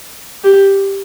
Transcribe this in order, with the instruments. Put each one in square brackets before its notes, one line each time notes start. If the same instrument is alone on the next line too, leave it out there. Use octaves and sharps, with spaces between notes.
[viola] G4